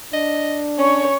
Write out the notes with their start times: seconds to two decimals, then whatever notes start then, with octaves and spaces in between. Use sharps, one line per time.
0.13 D4 D#5
0.78 C#4 C#5 C#6